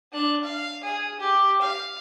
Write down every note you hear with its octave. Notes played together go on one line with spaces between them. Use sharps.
D4 F#6
F5
G#4
G4
F5